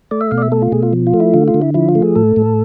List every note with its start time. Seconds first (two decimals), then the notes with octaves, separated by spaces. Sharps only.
0.11 A3 D5
0.21 E5
0.31 B2 F5
0.38 D5
0.42 E5
0.52 A3 A4
0.62 F4
0.72 B2 G#4
0.83 F4
0.93 F3
1.07 F4
1.14 A3
1.20 E4
1.34 D3 F4
1.48 F4
1.54 D3
1.61 E4
1.74 F3 E4
1.89 F4
1.95 A3
2.02 G#4
2.15 A2 A4
2.36 A2